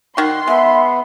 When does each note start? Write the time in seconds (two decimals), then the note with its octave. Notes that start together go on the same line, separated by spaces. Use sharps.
0.17 D#3 F#4 C6
0.47 G#3 B3 E5